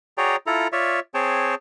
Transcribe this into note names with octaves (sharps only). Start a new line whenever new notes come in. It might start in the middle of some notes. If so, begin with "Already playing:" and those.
F#4 G#4 C#5 D5 G5 A#5
E4 F4 A4 A#5
F4 C#5 D5 E5
C4 G#4 C#5 G5 A5